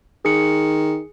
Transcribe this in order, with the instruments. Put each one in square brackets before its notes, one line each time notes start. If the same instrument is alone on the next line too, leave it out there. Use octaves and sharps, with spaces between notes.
[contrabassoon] D#3 [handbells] G#4 C#7